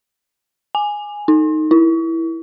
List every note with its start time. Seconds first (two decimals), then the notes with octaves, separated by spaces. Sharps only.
0.75 G#5
1.28 D#4
1.71 E4